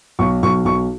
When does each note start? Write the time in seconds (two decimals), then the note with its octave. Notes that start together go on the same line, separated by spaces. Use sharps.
0.19 B1 C#6
0.43 B1 C#6
0.65 B1 C#6